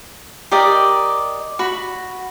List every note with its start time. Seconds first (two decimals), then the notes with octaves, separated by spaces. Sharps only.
0.51 G4 A#4 D5 D#5
1.59 F#4 B5